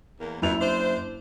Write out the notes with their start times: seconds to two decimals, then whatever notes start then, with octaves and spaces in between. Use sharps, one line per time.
0.20 E2 A#3
0.42 F#1 F2 B2 E4 F7
0.61 D4 C5